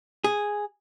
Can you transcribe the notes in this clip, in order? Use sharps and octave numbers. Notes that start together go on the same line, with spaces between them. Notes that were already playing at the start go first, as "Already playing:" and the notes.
G#4